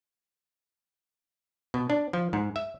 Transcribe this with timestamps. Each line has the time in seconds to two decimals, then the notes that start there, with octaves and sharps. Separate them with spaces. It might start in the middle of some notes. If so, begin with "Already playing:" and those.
1.74 B2
1.90 D4
2.13 F3
2.33 G#2
2.56 E5